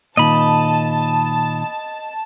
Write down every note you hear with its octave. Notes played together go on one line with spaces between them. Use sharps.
A#2 D#3 D#5 A5 B5